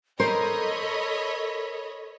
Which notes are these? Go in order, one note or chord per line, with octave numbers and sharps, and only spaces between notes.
A4 A#4 C5 C#5 D#5 B5